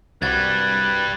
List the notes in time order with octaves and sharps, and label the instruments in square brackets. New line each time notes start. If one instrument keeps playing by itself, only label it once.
[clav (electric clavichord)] C2 F#4 [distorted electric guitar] G2 G3 [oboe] B4 [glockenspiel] G#6 A6